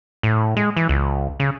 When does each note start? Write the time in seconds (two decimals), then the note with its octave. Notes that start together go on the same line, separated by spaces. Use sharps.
0.23 A2
0.57 G#3
0.77 E3
0.89 C#2
1.40 C#3